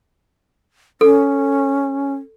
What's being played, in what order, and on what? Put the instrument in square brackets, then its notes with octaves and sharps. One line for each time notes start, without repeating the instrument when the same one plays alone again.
[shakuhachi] C#4 [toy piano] A4